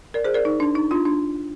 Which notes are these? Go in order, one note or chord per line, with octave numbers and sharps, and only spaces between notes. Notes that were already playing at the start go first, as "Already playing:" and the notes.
A#4 D5
G#4 C5
A#4 D5
D#4
D4
D#4
D4 F4
D4